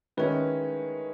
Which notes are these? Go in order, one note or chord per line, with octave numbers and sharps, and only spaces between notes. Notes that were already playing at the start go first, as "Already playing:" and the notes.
D#3 G#3 C#4 E4 B4